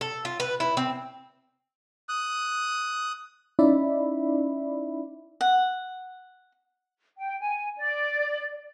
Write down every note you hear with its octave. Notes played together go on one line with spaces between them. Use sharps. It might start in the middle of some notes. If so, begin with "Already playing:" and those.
A4
F4
B4
E4
C4
D#6 F#6
C#4 D#4 E4 D5 E5 B5
F#5
G5
G#5
D5